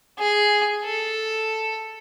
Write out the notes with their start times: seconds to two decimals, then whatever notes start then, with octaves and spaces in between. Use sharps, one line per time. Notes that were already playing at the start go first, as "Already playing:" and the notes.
0.19 G#4
0.84 A4